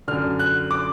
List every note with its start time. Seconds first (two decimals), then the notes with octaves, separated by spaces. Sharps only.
0.08 F#2 D3 F6
0.39 F#6
0.71 D6